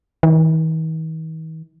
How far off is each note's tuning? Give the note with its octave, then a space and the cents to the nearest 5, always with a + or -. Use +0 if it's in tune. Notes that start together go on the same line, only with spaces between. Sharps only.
D#3 +45